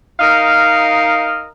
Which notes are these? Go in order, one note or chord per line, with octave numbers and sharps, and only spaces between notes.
D#4 A#4 D#5 F5